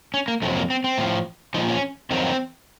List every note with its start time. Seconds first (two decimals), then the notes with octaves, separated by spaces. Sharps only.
0.14 C#4
0.28 A#3
0.42 F2 C3 F#3 A3
0.56 A#3
0.70 C4
0.84 C4
0.98 A2 F3
1.54 F3 D#4
1.58 A#2
1.68 C#4
2.11 F2 D#3 F#3 C4